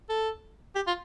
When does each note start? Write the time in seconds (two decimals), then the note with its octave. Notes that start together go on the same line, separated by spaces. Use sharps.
0.10 A4
0.76 G4
0.87 F4